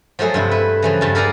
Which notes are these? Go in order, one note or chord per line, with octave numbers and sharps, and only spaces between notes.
F3 F#3 A3 E4 G#4
G2 C3 E4
B4
C#3 E3 F3
E2 G2 A5
A4 A#4 D5 F5 G#5 A#5